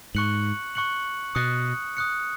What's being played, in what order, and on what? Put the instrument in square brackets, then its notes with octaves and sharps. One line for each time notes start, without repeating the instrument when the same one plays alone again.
[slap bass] G#2 [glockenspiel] C#6 F#6 C#7 F#7
[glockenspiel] C#6 F#6 C#7 F#7
[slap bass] B2 [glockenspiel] D#6 F#6 C#7
[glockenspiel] D#6 F#6 C#7